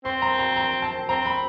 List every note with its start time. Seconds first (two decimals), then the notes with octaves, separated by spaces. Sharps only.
0.05 C4 C6
0.22 A#5
0.39 A#5
0.56 A#5
0.82 A5
1.09 C4 A#5
1.26 B5